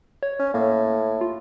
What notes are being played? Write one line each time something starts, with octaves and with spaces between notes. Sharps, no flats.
C#5
C#4
A2 A#3
F4